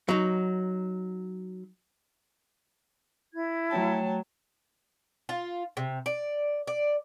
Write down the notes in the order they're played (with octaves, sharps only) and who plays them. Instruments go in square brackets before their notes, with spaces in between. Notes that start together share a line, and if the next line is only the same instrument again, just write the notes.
[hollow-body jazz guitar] F#3 D#4
[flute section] E4 G#6
[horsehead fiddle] F#3 A5 [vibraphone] A3 C#5 G5
[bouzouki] F4
C3
D5
D5